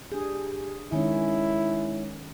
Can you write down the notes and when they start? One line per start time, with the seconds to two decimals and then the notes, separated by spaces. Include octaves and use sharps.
0.12 D4 G4 G#4
0.92 D#3 G#3 C#4 D#4 E4 C#5